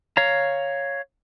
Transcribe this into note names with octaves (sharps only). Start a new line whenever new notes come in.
C#5 F5 A#5